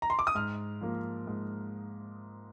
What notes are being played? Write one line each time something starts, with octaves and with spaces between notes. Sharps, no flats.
A#5
C6
D6
D#6
G#2 F6
F3 A#3
G#2